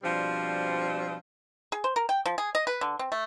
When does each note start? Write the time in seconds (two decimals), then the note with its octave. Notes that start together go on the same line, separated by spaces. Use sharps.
0.03 B2 F3 G3 C4 D4 F#4
1.72 G#4
1.84 C5
1.96 A#4
2.09 G5
2.26 F3
2.38 G#4
2.55 D#5
2.67 B4
2.81 D3
2.99 C4
3.12 A3